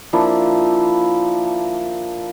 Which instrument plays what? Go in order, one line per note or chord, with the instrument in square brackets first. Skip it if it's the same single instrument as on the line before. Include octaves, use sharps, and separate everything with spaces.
[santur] F3 A#3 D4 E4